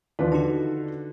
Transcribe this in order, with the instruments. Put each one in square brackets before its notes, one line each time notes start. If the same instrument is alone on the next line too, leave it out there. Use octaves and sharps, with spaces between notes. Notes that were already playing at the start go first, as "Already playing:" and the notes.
[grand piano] D#2 E3 F3 [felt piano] D4 F4 B4
[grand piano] D3 [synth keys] D#4 F#4